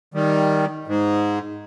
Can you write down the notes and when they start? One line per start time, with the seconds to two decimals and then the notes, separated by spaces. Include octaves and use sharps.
0.14 D#3 G3
0.88 G#2